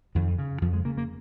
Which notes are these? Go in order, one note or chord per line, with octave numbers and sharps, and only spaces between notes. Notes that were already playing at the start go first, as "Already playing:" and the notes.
F2 D#3
C#3
F2 F3
G#3
C#3 A#3
A#3